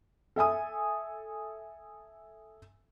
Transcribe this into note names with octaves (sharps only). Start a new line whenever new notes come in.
A4 E5 G#5 D#6